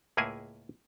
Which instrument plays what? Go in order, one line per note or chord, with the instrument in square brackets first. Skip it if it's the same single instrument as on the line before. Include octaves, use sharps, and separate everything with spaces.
[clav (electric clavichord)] C#2 A2 A#3 E4 G#4 G#5